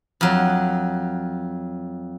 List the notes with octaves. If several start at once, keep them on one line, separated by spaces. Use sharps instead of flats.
F2 F#3